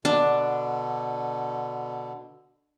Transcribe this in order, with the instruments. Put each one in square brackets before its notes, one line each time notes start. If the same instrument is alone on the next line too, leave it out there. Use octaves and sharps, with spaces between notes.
[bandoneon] B2 D3 [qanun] D4